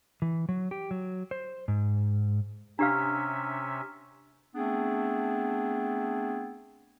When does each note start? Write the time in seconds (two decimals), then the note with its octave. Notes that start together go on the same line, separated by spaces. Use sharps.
0.22 E3
0.49 F#3
0.71 G4
0.91 F#3
1.31 C5
1.68 G#2
2.79 C3 C#4 D4 G4 E5 F5 A#5 F6
4.55 A3 B3 C4 D4 G#4